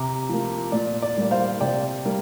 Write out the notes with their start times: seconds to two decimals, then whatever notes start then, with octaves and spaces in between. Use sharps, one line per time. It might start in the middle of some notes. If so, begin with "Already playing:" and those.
Already playing: C3 A#5 D6
0.29 F3 A#3
0.72 A#2 D5
1.02 D5
1.17 G3 A#3
1.31 C5 F5
1.61 C3 D5 G5
2.05 G3 A#3